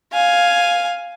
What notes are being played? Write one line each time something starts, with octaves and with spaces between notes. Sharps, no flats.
F5 G#5